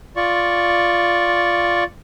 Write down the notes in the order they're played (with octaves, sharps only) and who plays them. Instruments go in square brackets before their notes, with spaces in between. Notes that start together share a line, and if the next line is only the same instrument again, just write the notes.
[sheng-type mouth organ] F4 D5 C#6